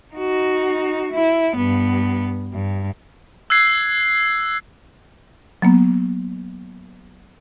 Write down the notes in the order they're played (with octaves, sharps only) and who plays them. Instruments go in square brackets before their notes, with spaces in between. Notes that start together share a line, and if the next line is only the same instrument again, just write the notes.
[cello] D#4 F#4
E4
G2 B3
G2
[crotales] E6 F#6 G#6 C7
[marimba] F#3 A#3 B3